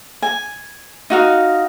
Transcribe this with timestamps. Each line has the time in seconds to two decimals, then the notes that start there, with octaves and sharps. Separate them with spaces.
0.22 G#5
1.10 D#4 F#4 F5